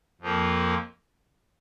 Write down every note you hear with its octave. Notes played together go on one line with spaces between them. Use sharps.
F2 F3 A#3